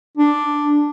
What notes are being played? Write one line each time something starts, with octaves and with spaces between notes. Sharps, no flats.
D4